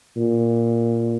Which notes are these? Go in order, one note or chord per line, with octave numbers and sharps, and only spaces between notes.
A#2